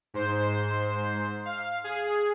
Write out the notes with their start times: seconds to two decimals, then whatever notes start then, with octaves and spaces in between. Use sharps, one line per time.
0.14 G#2 C5
1.46 F5
1.84 G#4